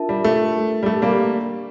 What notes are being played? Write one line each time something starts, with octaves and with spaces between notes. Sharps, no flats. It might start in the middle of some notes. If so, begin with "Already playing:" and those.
Already playing: D4 F4 A#4 E5 A5
G3
A3
D4 G4 A#4
G3
A3
G3 A#3